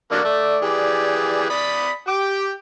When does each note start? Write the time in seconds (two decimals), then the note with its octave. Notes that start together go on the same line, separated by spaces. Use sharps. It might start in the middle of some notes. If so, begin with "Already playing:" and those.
0.11 D3 F#3 A#3 D5
0.25 A3
0.62 E3 G4 G#4
1.50 D5 B5 D#6 B6
2.08 G4 G5 D6